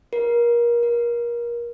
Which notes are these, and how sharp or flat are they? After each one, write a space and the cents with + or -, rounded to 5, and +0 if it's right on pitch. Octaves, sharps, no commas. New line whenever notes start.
A#4 +30
A#4 +30